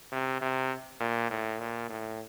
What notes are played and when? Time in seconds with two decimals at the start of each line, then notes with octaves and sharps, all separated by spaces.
0.12 C3
0.41 C3
1.00 A#2
1.30 A2
1.59 A#2
1.89 A2